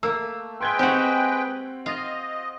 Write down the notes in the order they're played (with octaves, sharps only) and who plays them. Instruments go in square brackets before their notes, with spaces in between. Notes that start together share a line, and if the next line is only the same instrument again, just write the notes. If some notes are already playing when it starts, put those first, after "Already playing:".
[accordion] A3 [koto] A#3 [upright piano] E6
[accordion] G#3 B4 G5 [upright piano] C6 G#6 G7
[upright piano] C4 F#5 [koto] F#4 G4
[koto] F4 [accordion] D#5